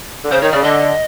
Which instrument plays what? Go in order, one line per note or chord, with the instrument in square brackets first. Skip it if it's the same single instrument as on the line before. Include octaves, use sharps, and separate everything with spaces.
[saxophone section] D3
[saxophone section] C#3 [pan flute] C5
[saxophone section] D#3 [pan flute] C#5
[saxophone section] C#3 [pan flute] D5
[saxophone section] D3 [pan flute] D#5